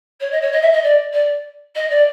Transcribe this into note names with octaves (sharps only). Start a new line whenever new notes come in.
C#5
D#5
C#5
D#5
E5
D#5
D5
D5
D#5
D5